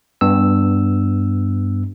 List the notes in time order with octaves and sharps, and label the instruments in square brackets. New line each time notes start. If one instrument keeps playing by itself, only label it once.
[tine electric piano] G2 B3 E6